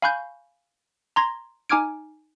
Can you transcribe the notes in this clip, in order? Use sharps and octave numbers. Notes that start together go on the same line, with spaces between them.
F5 G#5 B5 C#6 F#6 G6
A#5 C6 G#6 A#6
D#4 G#5 D6 F6 G#6 D7